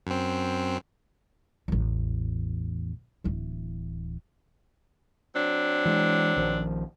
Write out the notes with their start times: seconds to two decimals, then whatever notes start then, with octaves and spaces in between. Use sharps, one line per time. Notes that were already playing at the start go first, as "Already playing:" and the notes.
0.07 F#2 C4
1.68 A1 E2
3.24 D1 E3
5.34 F#3 C4 D4
5.85 E3 G#3
6.36 A#1 D#3 F3